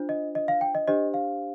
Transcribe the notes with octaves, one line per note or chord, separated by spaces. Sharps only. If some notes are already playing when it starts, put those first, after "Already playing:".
Already playing: D4 F4 C5
D#5
D#5
F5
G5
D#5
D4 G4 C5 D#5
F5